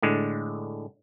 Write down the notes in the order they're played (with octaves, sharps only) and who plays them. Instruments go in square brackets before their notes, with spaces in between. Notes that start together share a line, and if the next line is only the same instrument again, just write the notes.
[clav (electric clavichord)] A2 D3 G#3